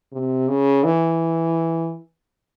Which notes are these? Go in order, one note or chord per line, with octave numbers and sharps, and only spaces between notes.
C3
C#3
E3